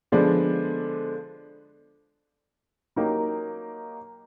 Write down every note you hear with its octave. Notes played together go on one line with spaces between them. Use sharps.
D3 F3 G#3 B3 D4
F#3 A#3 D#4 G4 A#4